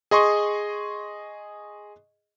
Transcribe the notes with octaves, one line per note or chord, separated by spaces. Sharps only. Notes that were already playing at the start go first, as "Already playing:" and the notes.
G#4 D#5 C6 C#6